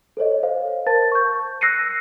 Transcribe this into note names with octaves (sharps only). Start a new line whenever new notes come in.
A4 C5 C#5 D#5
C5 F5
A#4 C5 A5 A6
C#6 G6
E6 F#6 A#6 C7 C#7 D#7